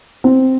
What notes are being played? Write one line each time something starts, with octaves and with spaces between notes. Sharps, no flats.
C4